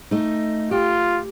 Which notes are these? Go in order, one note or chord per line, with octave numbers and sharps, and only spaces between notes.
A3 D#4
F4 G4